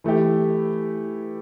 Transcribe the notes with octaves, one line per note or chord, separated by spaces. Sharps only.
E3 A3 E4 G4